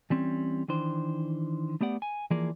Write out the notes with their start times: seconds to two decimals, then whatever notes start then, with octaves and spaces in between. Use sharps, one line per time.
0.10 E3 G3 C4 C#4
0.68 D#3 E3 D4 C5
1.81 A3 B3 G4 D5 F#5
2.02 G#5
2.31 E3 F3 A#3 G#4 A#4 D5